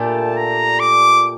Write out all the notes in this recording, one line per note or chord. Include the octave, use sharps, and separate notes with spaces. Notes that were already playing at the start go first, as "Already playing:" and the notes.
Already playing: A#2 A3 D4 G4 A5
A#5
D6